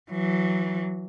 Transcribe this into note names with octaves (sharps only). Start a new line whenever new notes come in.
E3 F#3